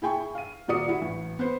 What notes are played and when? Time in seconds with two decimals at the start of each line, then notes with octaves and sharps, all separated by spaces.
0.02 E4 G#4 G5 G#5 C#6
0.35 F5 D#7
0.68 D#1 A#3 F#4 D5 D#6 C#7
0.88 E4 F#4
1.02 A1
1.39 B3 B4 C5